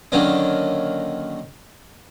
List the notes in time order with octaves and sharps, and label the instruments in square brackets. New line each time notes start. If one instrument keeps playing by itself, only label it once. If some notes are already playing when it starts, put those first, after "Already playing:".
[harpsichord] D3 D#3 F#3 A#3 C#4 D4